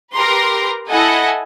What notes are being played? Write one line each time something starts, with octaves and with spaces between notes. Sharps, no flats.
G4 A#4 B4 A#5 C6
E4 A4 D#5 F#5 G#5